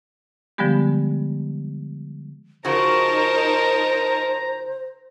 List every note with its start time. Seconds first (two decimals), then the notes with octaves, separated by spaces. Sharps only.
0.58 D3 F3 G3 G#3 B3 G4
2.65 C#3 F3 D#4 F#4 A#4 C5 A5 A#5